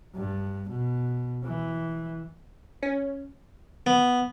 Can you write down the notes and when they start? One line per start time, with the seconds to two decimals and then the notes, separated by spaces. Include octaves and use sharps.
0.15 G2
0.69 B2
1.44 E3
2.83 C#4
3.87 B3